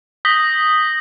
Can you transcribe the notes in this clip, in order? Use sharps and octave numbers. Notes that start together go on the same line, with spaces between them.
D#6 G6 A#6 B6 F#7 G7